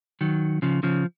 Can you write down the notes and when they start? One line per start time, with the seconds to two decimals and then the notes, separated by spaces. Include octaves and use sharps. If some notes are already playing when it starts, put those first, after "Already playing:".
0.21 D#3 F#3
0.62 C#3 F3
0.83 C#3 F3